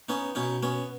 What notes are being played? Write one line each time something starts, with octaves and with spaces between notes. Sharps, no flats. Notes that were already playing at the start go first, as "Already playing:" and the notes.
B3 C#4 D#4
B2 C#4 D#4
B3 C#4